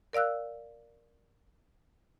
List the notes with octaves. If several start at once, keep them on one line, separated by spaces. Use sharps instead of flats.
A#4 D5 F5 E6 F#6